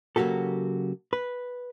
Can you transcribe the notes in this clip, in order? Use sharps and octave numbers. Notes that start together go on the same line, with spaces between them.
C#3 F#3 A#3 F#4 G4 A4
B4